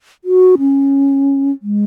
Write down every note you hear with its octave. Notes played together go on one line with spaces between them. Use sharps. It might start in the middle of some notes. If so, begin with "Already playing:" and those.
F#4
C#4
G#3